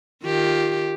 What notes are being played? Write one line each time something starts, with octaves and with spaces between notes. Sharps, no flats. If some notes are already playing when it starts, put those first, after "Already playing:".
D#3 F4 G4